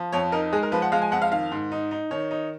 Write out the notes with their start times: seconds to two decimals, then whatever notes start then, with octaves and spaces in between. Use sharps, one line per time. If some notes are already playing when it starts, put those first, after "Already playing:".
Already playing: F3
0.12 F2 C#5
0.32 D#4 A#4
0.53 G#3 G#4
0.63 A#4
0.72 F3 B4
0.82 F#5
0.92 G#3 F5
1.02 G#5
1.12 F2 F#5
1.22 F5
1.32 D#3 F5
1.52 G#2
1.72 D#4
1.91 D#4
2.11 D#3 C#5
2.31 D#4